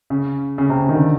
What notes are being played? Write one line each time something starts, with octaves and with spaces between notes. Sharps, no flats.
C#3
C#3
C3
C#3
D#3
D3